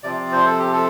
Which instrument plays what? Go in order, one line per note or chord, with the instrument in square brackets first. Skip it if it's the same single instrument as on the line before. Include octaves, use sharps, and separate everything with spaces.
[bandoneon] C3 F3 C4 D5
C5
A4
G4
A4